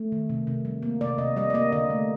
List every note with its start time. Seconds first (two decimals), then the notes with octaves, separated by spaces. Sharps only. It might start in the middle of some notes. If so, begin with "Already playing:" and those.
Already playing: A3
0.12 D#3
0.29 C3
0.47 C3
0.65 G3
0.82 A#3
1.01 C3 D5
1.18 C3 D#5
1.36 G3 D#5
1.50 D5
1.54 A#3 D#5
1.72 D3 D#5
1.90 A3